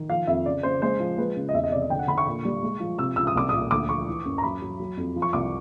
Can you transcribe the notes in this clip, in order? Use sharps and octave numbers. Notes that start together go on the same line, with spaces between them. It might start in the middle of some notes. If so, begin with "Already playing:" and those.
Already playing: D#3
F3 F5
F2 E5
C#3 D5
C#3 C5
G#3 C5
F3
G#3 B4
C#3
D#5
E2 E5
D#5
C3 D5
D#5
D3 G5
F#5
D3 B5
C#6
A#2
G3
G#3
F3
C3 E6
C#2 E6
D#6
C2 D6
A#2 D#6
D2 D6
F3 C#6
E3
F#2
A#5
F#3 B5
F#3
F#3
F2
F3
C#6
C2 D6